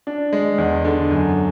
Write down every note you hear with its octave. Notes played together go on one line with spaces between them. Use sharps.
D4
G#3
E2
D3
F#2